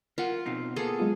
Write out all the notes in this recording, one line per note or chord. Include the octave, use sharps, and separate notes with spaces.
F4 A#4 F#5
B2 C4 D#4
A#3 B3 G#4 A4
F#3 G#3 F4